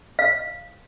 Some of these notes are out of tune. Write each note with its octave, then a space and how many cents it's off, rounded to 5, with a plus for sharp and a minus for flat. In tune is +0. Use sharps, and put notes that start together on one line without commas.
F5 -10